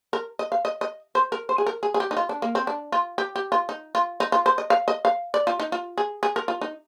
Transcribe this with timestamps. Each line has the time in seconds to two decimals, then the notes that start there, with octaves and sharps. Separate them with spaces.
0.13 A#4
0.39 D#5
0.52 F5
0.65 D#5
0.81 D#5
1.15 C5
1.32 A#4
1.49 C5
1.58 G#4
1.66 A#4
1.83 G#4
1.94 G#4
2.00 G4
2.11 D#4
2.17 F4
2.29 D4
2.42 A#3
2.55 C4
2.67 D4
2.92 F4
3.18 G4
3.36 G4
3.52 F4
3.69 D#4
3.95 F4
4.20 D#4
4.32 F4
4.46 C5
4.58 D#5
4.70 F5
4.88 D#5
5.05 F5
5.34 D5
5.47 F4
5.60 D#4
5.72 F4
5.98 G#4
6.23 G#4
6.36 A#4
6.48 F4
6.61 D#4